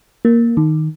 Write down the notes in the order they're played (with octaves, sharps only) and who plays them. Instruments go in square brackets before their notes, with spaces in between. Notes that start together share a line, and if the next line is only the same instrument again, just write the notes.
[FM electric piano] A#3
D#3